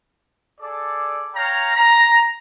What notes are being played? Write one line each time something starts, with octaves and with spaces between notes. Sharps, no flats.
G#4 A4 D5
C#5 F5 G5 A#5
A#5